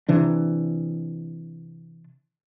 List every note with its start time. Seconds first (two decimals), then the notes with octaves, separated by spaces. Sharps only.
0.09 C3 E3 D4